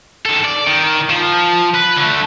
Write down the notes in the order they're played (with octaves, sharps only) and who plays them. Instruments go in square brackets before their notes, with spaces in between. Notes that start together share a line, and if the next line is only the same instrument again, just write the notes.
[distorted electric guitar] D#3 A4
D5
D#3
F3
B4
D3 A3